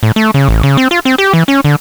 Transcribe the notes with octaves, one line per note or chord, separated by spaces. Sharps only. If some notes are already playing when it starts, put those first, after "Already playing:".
A2
A3
C#3
A1
C#3
C4
F4
C4
G4
E3
C#4
D3